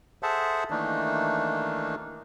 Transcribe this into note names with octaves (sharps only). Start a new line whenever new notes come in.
G#4 A4 C5 E5 F#5 A5
D#3 E3 A3 A#3 D4 D#4